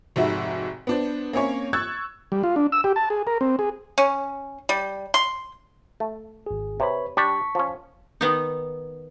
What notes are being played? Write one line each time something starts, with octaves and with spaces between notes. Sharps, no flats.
F1 G#2 F#4 E5
B3 D4 C5
A#3 C4 C#4 C#5
C#6 E6 F#6 G#6 A6
G3
F4
D4
E6
G4
A5
G#4
A#4
C4
G#4
C#4
G3
C6
A3
G#1 G#4
C3 B4 C#5 B5
G3 D4 G4 A5 C#6 B6
F3 C#4
D#3 B3 D#4